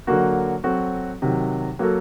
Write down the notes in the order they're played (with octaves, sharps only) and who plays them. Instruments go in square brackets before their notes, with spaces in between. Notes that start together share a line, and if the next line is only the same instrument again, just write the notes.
[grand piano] D3 F#3 A#3 F#4
F#3 C4 F#4 A4
C3 D#3 F#3
F#3 A#3 F#4 A4